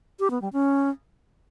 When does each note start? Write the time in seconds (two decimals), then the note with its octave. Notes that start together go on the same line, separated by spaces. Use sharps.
0.20 G4
0.31 B3
0.42 G3
0.53 C#4